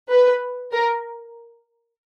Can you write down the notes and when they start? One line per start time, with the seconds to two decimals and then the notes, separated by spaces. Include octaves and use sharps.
0.10 B4
0.72 A#4